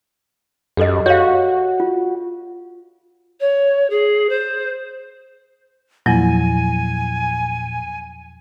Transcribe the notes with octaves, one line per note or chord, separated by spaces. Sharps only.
F#2 G4 A4 D#5
F#4 C#5 F5
F4
C#5
G#4
C5
E2 A#2 F3 F#3 G#5